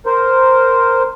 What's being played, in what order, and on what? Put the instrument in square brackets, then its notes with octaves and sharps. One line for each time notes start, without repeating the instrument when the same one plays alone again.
[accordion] A#4 C5